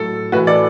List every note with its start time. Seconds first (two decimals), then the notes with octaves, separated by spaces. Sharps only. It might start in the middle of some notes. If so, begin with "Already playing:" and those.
Already playing: A2 F#3 A4
0.32 A2 E3 F#4 B4
0.47 A4 D5